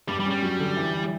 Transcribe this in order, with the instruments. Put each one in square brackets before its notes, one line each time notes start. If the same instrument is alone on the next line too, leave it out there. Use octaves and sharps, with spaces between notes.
[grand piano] G2 [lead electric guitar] G3
[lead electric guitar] G3
[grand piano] C#4
[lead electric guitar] G3
[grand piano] F#3
D3
E3
E3